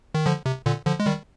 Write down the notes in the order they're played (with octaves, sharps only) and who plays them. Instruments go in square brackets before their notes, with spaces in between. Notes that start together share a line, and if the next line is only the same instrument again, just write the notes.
[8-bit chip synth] D#3
D3 F3
C3
A#2 D3
D3 F3
G#3
D#3 G3